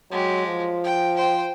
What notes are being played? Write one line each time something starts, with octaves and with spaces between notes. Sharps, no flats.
F#3 G#3 G4
F3
G5
C5 G5